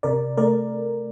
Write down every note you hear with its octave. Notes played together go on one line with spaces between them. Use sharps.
C3 A#4 D5
A3 A#4 D5